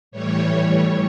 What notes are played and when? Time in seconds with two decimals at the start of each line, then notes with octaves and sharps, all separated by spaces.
0.11 A2 E3 G3 C#5